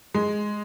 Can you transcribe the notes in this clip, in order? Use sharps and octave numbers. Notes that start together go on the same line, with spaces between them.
G#3